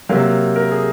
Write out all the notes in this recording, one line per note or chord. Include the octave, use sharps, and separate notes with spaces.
C3 F#3 A#3 F5
A#4
G#4